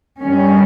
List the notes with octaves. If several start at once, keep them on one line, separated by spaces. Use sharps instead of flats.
G2 D#3 G3 C#4